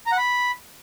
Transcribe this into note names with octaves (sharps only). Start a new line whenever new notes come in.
A#5
F#5
B5